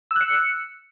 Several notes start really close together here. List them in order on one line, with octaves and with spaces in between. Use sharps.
E6 F#6 C#7